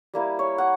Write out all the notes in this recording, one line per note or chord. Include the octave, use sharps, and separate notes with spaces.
G3 A#3 E4
C#5
F#5